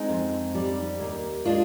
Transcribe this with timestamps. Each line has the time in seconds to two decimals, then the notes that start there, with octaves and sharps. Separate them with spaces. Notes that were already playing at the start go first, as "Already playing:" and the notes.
Already playing: G#3 C4 D#4
0.08 F2
0.55 G3
1.00 D#2
1.45 G#3 D4 F4